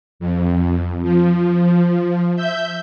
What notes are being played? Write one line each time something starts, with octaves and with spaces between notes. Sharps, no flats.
F2
F3
E5 G6